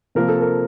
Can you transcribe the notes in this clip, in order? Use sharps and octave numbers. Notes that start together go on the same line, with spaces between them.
C3 F3 A#3 A#4
A4
A#4